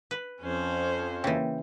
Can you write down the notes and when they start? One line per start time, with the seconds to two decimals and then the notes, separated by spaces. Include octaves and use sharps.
0.11 B4
0.42 F2 C#4 C5
1.24 C#3 E3 A#3 G5